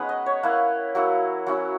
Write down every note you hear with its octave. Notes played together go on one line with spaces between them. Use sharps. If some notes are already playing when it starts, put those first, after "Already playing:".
Already playing: G#3 B3 C#4 D#4 B4 C#5
D#5
C#5
A#3 E4 B4
F#3 A#3 E4
F#3 C#4 E4